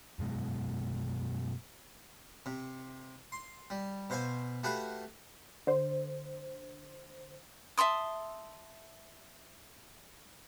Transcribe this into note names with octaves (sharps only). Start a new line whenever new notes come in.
F#2 B2 G#3
C3
C6
G3
B2 C5 F5 G#5
A3 F#4 G4 B4 F5
D3 C5
E5 A5 C6 D#6